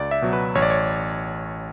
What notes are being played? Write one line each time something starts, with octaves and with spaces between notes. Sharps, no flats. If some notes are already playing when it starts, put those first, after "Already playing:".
Already playing: C#2 D5
E5
B2 F#3
B4
A1 C#5
D5
C#5